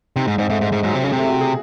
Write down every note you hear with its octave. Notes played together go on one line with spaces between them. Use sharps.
C3 D#4
G#2
G#2 C4
G#2 A3
G#2 G#3
G#2
G#2 F#3
C3
C#3 G#3
C3
A3
E4
F#4
G#4